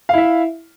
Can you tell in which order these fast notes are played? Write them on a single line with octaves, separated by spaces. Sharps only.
F5 E4 E5